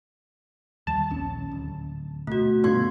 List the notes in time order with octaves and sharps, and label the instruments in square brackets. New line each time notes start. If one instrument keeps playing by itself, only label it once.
[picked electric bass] D#2 D#3 G3 [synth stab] A5
[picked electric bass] A#1 D#2 C#4
D1
[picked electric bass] B2 [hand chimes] A3 F#4
[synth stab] G2 A#2 D3 [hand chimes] B3 C6 G#6